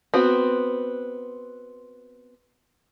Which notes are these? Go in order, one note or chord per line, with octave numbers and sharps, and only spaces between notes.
B3 C4 F#4